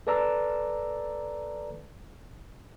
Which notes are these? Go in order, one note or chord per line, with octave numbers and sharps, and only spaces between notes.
A4 B4 D5 A5 A#5 E6